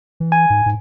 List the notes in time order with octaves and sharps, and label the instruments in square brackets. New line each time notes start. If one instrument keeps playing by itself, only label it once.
[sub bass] E3
[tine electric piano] G#5
[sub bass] G#2
G#2